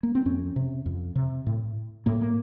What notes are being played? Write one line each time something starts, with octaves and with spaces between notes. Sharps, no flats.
A#3
C4
F2 C#4
C3
F2
C3
A2
A2 A#3
A#3